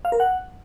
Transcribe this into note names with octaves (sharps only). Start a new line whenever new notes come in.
F5
A#4
F#5